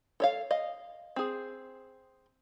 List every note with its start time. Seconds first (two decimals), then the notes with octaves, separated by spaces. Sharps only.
0.20 A4 C#5 F5
0.51 D#5 F5
1.16 C4 G#4